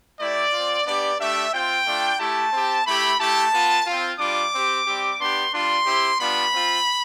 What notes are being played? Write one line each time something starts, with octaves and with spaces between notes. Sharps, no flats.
A3 E4 G4 D5
C4 F4
B3 D4 G4 D5
A3 D4 G4 E5
C4 F4 G5
A3 D4 F4
A3 E4 G4 A5
C4 G4
A3 E4 G4 B5
A3 E4 G4 A5
B3 F4
C4 F4
G3 D4 F4 D6
C4 G4
G3 C4 G4
B3 D4 G4 C6
G3 D4 F4 C6
C4 E4 G4
G3 B3 D4 F4 B5
C4 F4